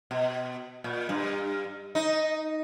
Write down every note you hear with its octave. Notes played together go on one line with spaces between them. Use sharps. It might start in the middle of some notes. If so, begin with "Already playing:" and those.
B2
A#2
G2
D#4